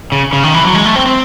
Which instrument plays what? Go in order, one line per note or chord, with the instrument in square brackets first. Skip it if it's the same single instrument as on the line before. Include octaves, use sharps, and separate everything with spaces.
[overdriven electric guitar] C#3
C#3
D#3
E3
F#3
G#3
A3
C4
C4